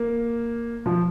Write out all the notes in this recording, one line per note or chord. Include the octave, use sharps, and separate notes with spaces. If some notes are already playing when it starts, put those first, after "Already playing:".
Already playing: A#3
F3